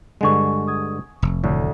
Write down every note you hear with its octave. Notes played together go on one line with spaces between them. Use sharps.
G2 D3 G#3 F#5 G#5 C#6
D#6 G#6
F1
D2 A2